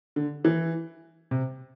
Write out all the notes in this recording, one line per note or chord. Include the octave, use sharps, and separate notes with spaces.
D3
E3
C3